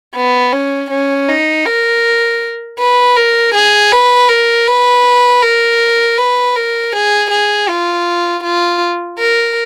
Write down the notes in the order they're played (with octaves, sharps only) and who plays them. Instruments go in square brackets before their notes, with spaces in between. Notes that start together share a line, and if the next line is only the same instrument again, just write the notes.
[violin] B3
C#4
C#4
D#4
A#4
B4
A#4
G#4
B4
A#4
B4
A#4
B4
A#4
G#4
G#4
F4
F4
A#4